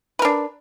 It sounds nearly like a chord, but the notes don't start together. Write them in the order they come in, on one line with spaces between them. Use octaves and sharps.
B4 A#4 D4